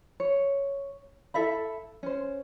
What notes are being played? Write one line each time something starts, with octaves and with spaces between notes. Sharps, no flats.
C#5
E4 A4 E5 B5
C#4 C5